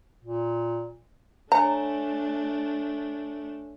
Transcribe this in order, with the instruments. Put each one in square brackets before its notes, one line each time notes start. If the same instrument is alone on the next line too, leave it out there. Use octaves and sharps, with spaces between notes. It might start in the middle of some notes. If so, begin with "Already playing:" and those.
[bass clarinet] A#2
[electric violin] A3 D4 [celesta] C#5 G#5 [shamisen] A#5